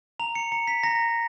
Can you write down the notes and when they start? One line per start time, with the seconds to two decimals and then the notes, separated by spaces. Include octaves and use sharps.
0.20 A#5 F7
0.35 C#7
0.52 A#5 C#7
0.67 B6
0.83 A#5 A#6